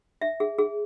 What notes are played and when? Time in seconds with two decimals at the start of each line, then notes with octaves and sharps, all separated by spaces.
0.22 E5
0.40 G#4
0.58 G#4